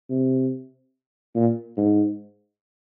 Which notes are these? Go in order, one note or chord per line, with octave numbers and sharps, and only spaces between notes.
C3
A#2
G#2